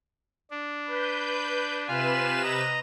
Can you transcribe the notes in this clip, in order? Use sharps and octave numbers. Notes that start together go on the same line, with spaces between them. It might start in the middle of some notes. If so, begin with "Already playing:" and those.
D4
B4 G6
C3 F4 B4 G#5 E7
D#5 A#5